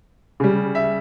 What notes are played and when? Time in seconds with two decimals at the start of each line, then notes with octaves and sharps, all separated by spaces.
0.40 C#3 G3
0.75 E5